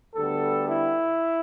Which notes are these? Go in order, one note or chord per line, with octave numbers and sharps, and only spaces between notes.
D2 D3 G3 B3 A4
E4